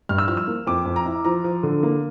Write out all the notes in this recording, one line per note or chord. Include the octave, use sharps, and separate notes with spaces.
G2 F6
E6
F3 F6
E6
A#3
F2 D6
F2
A#5
E4
F3 A#5
F3
D3
A#3